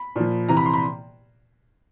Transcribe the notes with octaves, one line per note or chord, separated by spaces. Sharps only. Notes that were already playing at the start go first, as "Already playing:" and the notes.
Already playing: B5
A#2 F3
C3 E3 A#5
B5
C6
B5